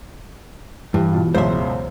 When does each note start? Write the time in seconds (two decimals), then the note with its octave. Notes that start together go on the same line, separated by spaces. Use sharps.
0.94 G2 E3
1.13 B2 F4
1.35 C#2 F#2 B2 C5 E5